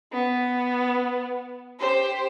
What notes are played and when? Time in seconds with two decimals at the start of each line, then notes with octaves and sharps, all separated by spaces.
0.13 B3
1.80 G4 C5